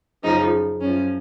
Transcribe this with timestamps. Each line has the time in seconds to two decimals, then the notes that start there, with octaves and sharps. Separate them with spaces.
0.23 F#2 C#3 F3 D#4
0.80 F#2 F3 C#4